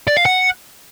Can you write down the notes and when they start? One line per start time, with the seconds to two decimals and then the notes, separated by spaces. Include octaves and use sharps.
0.08 D5
0.17 F5
0.26 F#5